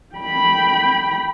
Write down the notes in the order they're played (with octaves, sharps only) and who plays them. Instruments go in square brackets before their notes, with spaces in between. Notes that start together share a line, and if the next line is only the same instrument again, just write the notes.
[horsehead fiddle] G5 B5